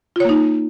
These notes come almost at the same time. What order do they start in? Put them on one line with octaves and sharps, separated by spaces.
F4 C#5 A#3 D#4